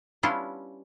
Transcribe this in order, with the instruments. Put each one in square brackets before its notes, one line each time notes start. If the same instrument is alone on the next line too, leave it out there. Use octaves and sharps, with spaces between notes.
[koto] G3 B3 C#4 D4 E4 F4